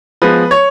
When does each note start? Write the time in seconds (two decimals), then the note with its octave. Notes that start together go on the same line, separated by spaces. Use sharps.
0.22 F3 G#3 B3 B4
0.51 C#5